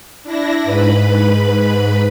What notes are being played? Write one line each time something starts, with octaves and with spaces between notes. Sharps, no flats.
D4 E4 A#6
G#2 B4 B5